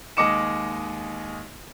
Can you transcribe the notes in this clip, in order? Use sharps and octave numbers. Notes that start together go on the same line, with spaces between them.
D#2 G#3 D#5 D6 C#7 E7